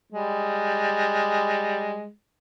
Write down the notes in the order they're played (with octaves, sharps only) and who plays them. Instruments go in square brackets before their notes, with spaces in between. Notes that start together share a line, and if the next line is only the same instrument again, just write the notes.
[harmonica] G3 G#3